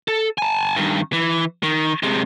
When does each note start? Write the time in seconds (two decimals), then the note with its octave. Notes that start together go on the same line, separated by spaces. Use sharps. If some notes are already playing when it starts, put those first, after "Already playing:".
0.08 A4
0.38 G#5 A5
0.76 G2 D#3
1.13 E3
1.63 D#3
2.03 C3 G#3